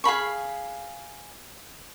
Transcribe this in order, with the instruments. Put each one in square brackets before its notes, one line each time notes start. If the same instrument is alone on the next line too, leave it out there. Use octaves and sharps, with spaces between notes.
[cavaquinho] G#4 F5 B5 C#6